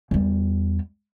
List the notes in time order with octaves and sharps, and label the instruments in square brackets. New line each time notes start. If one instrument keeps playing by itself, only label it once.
[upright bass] E2 G3